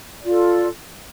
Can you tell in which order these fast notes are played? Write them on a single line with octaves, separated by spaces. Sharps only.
D5 F4 A4